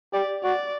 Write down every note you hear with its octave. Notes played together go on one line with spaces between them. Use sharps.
G4 D5
F#4 D5